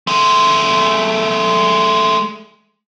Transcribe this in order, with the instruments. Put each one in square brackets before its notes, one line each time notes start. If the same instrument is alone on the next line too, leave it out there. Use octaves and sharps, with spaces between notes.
[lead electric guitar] G#3 A3